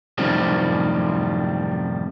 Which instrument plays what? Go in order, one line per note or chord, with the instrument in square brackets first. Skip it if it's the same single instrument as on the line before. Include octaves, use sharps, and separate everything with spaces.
[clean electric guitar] F#2 A2 C3 D#3 F3 G3